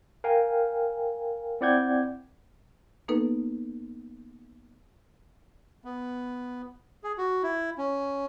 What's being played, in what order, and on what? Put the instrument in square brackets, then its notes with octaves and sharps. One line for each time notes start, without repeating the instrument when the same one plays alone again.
[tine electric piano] A#4 F5 G5 G#5
C4 E4 D5 F#5 G6 G#6
[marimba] A#3 B3 D#4 A4 B4
[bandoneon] B3
G#4
F#4
E4
C#4